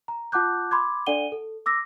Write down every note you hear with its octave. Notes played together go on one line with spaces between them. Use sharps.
A#5
F4 F#5 A5 D6 F#6 G6
B5 C6 D6 G#6
D4 A4 D5 F#5 D#7 G7
A4
D6 E6 A#6